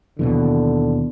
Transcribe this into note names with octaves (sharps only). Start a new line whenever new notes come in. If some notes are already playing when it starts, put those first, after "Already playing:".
D#2 B2 D3 E3